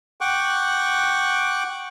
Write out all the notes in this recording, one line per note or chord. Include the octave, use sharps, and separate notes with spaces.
F#5 G5 C#6 D6 F#6